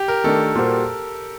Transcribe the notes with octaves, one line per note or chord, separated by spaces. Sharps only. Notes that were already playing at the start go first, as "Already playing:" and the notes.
Already playing: G4
A#4
D#3 A3 D4 A4
A#2 G3 A#3 F#4 C5